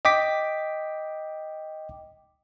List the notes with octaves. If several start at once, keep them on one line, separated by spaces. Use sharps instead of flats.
D#5 G5 D6 B6